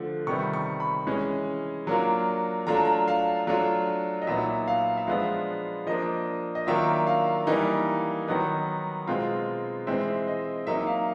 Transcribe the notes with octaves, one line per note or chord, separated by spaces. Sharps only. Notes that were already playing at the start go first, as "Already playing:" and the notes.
Already playing: D3 F3 A3
C3 D#3 G3 B3 C#6
C#6
B5
E3 G#3 C#4
F#3 A#3 D4 F4
F#3 A3 D4 F4 A#5
A5
A#5
F5
F#3 A3 D4 F4
D#5
A#2 F#3 B3 D#4 E5
F5
E5
F3 G#3 B3 D4 F4 F5
F3 A#3 D4 D#5
D#5
D#3 F#3 A#3 D4 F4 E5
F5
E3 G3 A#3 D#4
D#3 F#3 B3 D#4
B2 G#3 C4 F4
E3 G#3 C4 E5
D#5
F#3 A#3 D#4 E5
F5